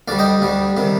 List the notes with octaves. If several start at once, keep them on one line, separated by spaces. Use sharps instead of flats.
D2 D3 G3 D5 F5
D#5 G5
D2 D3 G3
C3 D#3 G3